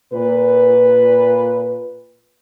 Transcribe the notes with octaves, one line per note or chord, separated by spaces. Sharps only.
A#2 B4